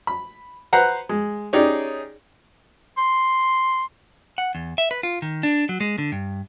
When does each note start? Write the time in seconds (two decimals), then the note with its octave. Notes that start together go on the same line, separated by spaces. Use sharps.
0.07 B5
0.73 B4 C5 F#5 A#5
1.09 G#3
1.53 C#4 D#4 G4 G#4 C#5 D5
2.98 C6
4.38 F#5
4.55 E2
4.78 E5
4.91 B4
5.03 F4
5.22 D#3
5.43 D4
5.69 F#3
5.81 G#3
5.98 D3
6.12 G2